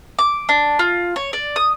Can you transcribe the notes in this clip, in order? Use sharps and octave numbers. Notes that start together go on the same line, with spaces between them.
D6
D4
F4
C#5
D5
D#6